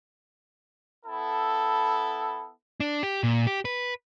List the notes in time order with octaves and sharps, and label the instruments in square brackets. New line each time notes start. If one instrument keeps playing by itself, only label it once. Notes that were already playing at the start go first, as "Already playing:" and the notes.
[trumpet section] B3 E4 A4
[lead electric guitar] D4
G4
A#2
G4
B4